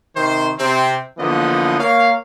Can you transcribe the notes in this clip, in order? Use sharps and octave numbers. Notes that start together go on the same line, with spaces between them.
C3 D#3 C5
C3 C4
D3 E3 F3 A#3 B3 D#5
A#3 A#4 C#5 F5